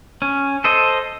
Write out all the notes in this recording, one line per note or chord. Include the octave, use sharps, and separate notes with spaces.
C#4
A4 C5 D#5